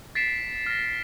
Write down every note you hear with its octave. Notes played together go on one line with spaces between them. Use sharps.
A6 B6 C7 D7 E7
F6 A#6